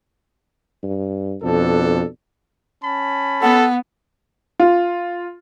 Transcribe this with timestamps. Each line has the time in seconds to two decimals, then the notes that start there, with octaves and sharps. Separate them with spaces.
0.83 G2
1.42 F2 B2 D4 A4
2.83 C#4 A5 B5
3.42 B3 A4 F#5
4.60 F4